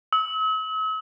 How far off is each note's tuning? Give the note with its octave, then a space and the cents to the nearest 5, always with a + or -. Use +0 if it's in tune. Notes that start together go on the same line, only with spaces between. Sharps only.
E6 -45